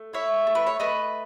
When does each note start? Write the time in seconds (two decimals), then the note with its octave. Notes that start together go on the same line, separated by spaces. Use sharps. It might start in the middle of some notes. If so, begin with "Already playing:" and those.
Already playing: A3
0.13 E4 C#5 E5
0.47 A3
0.55 B4
0.67 C#5
0.80 A3 B4 D#5